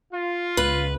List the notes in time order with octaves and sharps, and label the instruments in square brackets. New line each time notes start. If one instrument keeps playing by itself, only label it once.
[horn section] F4
[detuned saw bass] C#2 [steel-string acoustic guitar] B4